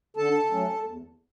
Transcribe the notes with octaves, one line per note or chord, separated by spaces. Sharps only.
D3 A4 A5
F#3 A3 C#4
E2